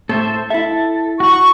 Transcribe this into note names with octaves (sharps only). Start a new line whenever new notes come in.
A2 A4 C5 E5
E4 A4 E5
F#4 F#5 C#6